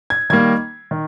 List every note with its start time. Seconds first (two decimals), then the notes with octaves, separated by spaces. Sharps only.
0.10 G#6
0.30 D#3 G3 A#3 G#6
0.91 D#3